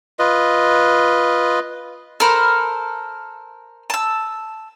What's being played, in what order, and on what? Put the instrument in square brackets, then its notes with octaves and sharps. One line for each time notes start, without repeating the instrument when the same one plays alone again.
[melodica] F4 B4 D#5
[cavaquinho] A4 A#4 C5 [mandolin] B5 F6
[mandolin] A5 E6